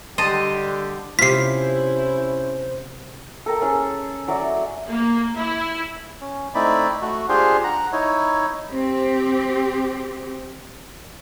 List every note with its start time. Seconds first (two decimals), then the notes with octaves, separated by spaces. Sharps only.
0.18 D3 G3 G4 D#5 A5 C6
1.19 C3 C#4 E4 F4 C5 B6 C7
3.46 A4 A#4 G5
3.62 C#4 G#4 A4
4.28 F#3 F#4 D5 E5
4.89 A#3
5.37 E4
6.21 C#4
6.55 A3 C4 D#4 E4 D5 B5
7.02 A3 F#4
7.29 D4 F4 G4 G#4 C5
7.64 F#5 A#5
7.92 D#4 E4 C#5
8.69 C4 G4